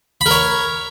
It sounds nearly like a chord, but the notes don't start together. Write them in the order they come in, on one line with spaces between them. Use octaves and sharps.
B5 A#4 C#5